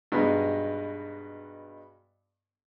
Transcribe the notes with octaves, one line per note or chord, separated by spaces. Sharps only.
G2 B2 G#3 B3 D#4